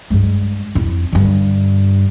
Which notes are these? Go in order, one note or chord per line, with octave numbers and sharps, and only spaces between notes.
G2 G#3
F2 E4
G2 D3